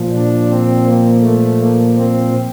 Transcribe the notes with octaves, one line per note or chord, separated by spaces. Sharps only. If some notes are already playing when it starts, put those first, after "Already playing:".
Already playing: A#2 F3
D4
C4
A#3
A3
A#3
C4